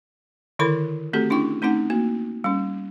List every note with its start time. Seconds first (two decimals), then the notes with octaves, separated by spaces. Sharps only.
0.59 D3 D#3 E4 A4 A#4 B5
1.13 A3 C4 F#4 G4 A4
1.30 C#4 D4 E4 G5 C#6
1.62 A3 C4 C#4 D#4 F#5
1.90 A#3 F#4
2.44 G3 C#4